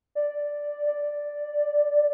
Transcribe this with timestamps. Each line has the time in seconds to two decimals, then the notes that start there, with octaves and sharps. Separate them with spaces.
0.15 D5
0.87 D5